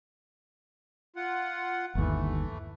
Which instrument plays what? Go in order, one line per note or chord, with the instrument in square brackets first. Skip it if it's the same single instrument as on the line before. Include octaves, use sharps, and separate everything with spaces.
[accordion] F4 F#5
[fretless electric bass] G1 D#2 [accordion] E3 A3